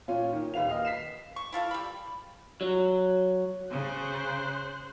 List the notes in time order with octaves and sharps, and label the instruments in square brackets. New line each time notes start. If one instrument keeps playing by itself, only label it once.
[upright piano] A#2 C#4 F4
D#3
D#1 D#2 B4 F5 F7
D#5 F5 F6
B6 C7 E7
[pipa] C#6
E4 F4 A4 F5
G3 B5
[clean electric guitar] F#3
[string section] C#3 [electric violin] C5 F#6